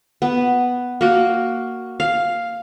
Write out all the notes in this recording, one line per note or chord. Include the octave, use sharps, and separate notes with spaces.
B3
A#3 F#4
F5